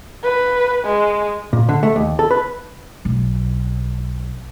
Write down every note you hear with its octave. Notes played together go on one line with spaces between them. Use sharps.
B4
G#3
A#2
D3
A3
D#2
A4
B4
B1